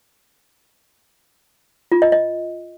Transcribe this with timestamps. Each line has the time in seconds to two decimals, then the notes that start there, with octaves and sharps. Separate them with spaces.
1.92 F4
2.02 D#5
2.12 D#5